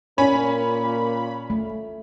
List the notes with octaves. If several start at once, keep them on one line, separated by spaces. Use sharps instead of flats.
A#2 C#4 B5
A3